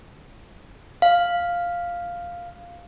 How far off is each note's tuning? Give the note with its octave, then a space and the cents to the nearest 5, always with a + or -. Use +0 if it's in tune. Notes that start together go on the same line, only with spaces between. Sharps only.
F5 +0